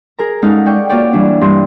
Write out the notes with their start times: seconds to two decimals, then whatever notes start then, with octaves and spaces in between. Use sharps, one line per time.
0.19 G#4 A#4 A#5
0.42 G#3 C#4 D#4 A4 F5 F#5
0.66 D5 G5 C#6
0.89 A#3 F4 F#4 C#5 D5 G5
1.13 E3 G3 D4
1.41 G2 C6